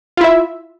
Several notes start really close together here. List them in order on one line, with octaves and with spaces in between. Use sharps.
F4 E4 E5